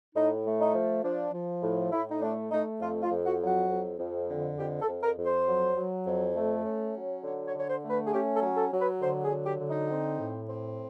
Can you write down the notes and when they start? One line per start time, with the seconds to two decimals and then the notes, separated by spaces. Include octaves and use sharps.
0.15 A2 D#4
0.44 A3
0.60 D#4
0.74 F3
1.04 F3 D4
1.33 F3
1.62 A2
1.92 A2 E4
2.10 D#4
2.22 A3 D4
2.51 A3 D#4
2.81 F2 F4
3.03 F4
3.11 F2
3.26 F#4
3.41 F#3
3.47 F#4
3.69 F2
3.99 F2
4.29 D3
4.58 F2 G4
4.81 A4
4.88 F2
5.03 A#4
5.17 F2
5.25 C5
5.47 F#3
5.77 F#3
6.07 F2
6.36 A3
6.65 C#4
6.95 F#3
7.24 D3 C#5
7.46 C#5
7.54 D3
7.59 C#5
7.68 C5
7.84 A3
7.90 B4
8.06 G#4
8.13 C#4 G4
8.35 A4
8.42 F#3
8.57 A4
8.72 F#3
8.80 B4
9.01 D3 C5
9.24 G#4
9.31 F#3
9.45 G4
9.60 D3
9.69 D#4
9.90 C4
10.19 A2
10.49 C4